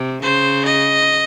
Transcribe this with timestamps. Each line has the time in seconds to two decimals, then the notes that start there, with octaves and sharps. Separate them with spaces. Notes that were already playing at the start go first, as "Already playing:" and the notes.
Already playing: C3
0.22 C#3 C5
0.66 D#5